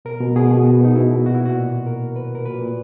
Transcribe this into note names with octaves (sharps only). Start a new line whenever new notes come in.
B2 A#4
B2
B2 G#4
B2
B2 F#4
B2 D#4
B2 E4
B2
A#2 F#4
E4
A#2 F#4
A#2
A#2
A#2 A#4
A#2
A#2 B4
A#2 A#4
A#2 B4
A#2